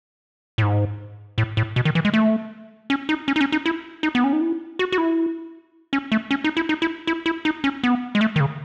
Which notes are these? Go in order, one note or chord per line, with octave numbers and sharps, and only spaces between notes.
A2
G#2
A2
A2
B2
D#3
E3
G#3
A3
C#4
D#4
C#4
D#4
C#4
D#4
E4
D#4
B3
C#4
D#4
E4
F#4
F#4
E4
C#4
A3
C#4
D#4
E4
D#4
E4
E4
E4
D#4
C#4
B3
G#3
A3
D#3
C#3